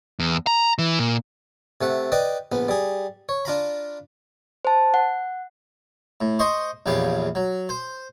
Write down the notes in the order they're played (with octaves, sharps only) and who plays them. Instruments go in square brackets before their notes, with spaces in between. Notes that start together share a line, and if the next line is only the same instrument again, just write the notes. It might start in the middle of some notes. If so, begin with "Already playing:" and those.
[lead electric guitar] E2
A#5
E3
A#2
[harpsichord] C3 A3 F#5
B4 D5 D#5 G5
A#1 B3
G3 G#4
C#5
D4 F4 A#5 B5
[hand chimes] C5 A5
F#5
[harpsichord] A2
C5 D#5 C6 C#6
A#1 E2 C#3 G3 F5
F#3
C5